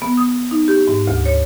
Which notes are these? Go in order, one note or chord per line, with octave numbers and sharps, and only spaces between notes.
B3
D#6
D#4
G4
G#2
D2
C#5